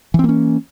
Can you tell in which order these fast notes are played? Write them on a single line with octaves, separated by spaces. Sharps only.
E3 C4 A#3 C#4